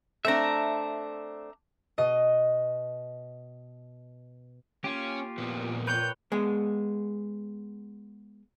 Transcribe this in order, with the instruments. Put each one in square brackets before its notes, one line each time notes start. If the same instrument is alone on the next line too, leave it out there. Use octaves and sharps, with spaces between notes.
[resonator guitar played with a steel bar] A3 C4 D4 [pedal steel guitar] E5 A#5
[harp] B2 D#5 D#7
[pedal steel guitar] A#3 F4 G4 [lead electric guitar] C#4
[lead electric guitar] F2 B3 [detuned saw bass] A#2
[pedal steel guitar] B4 C#5 G5 [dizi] G6
[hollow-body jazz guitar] G#3 B3 G#4